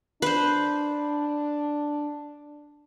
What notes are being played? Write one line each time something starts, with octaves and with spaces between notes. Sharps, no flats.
D4 B4 C5